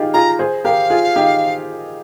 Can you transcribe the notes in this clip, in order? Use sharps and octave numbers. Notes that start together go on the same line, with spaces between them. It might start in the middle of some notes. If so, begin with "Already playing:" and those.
Already playing: D#4 F4 G4 G#4
F4 G#4 A#5
G#4 C5
G4 A#4 F5
F4 G#4
D#4 G4